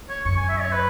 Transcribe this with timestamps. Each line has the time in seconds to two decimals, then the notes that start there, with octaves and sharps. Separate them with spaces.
0.09 C#5
0.25 F#2 C#6
0.37 G#5
0.49 E5
0.61 C#5
0.72 B4